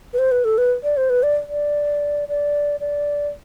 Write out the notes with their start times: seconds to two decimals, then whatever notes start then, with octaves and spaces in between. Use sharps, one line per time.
0.13 B4
0.19 C5
0.31 B4
0.45 A4
0.58 B4
0.83 D5
0.97 C5
1.10 B4
1.23 D5
1.48 D5
2.29 D5
2.80 D5